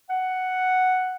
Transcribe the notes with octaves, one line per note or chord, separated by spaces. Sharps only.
F#5